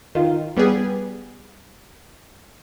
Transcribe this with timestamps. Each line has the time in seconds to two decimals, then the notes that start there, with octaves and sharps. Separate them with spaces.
0.15 D#3 F4
0.57 G3 B3 G4 G#4